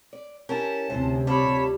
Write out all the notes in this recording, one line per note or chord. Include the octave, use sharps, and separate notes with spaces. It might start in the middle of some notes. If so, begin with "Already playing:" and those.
D5
C#4 E4 G4 A#4 A5
D2 C3 E3 C5
G3 C4 F4 C#5 A5 B5